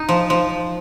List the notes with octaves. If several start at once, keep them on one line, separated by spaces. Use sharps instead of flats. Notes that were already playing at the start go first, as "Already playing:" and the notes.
Already playing: D#4
F3
F3